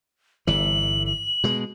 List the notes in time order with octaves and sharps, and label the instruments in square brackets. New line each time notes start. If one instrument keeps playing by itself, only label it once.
[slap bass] G1 E3 [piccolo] F#7
[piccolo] F#7
[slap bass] B2 G#3